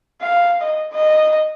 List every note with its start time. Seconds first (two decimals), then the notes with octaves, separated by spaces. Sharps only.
0.22 F5
0.62 D#5
0.92 D#5